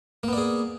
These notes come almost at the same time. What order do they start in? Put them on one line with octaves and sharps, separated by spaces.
A#3 B3 D5 G#4